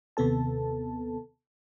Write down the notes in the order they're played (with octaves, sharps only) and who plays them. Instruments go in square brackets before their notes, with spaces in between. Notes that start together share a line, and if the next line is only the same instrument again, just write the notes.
[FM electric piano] D#2 C3 B3 A4 A5